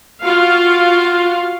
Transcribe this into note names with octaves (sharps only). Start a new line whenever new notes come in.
F4 F#4 F5